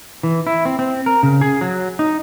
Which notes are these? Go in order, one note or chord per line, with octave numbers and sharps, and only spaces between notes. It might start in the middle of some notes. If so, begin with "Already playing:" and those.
E3
E4
C4
C4
A#4
C#3
G#4
F#3
D#4